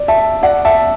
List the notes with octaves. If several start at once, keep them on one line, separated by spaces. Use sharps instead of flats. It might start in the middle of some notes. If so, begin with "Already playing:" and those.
Already playing: D5
E5 A5
D5 F#5
E5 A5